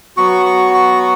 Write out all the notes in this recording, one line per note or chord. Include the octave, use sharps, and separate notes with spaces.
F#3 B3 F#4 C#6
C#6
C#6